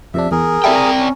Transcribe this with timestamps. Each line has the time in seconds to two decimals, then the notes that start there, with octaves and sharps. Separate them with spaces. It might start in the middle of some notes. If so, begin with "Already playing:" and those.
0.14 F2 C3 D4 E5
0.31 E2 G#4 A#4
0.64 C4 E4 G4 A4 D5 G5
0.76 A#5
0.99 C#4